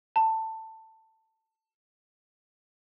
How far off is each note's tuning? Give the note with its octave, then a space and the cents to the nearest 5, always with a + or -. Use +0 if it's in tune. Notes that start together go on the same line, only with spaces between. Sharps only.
A5 +15